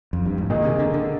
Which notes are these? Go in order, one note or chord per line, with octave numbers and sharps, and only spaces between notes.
F2
G2
G#2
A#2 D#3 A#3 D#4 G#4
C3
D3
D3